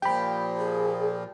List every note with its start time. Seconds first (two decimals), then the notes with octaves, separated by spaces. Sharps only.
0.02 A#2 F3 G4 G5 B5
0.58 G#4